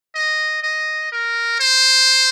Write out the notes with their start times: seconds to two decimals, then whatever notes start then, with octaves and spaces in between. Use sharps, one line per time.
0.15 D#5
0.63 D#5
1.12 A#4
1.60 C5